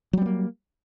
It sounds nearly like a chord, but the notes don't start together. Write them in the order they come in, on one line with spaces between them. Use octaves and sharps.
F#3 G3 B3 A#3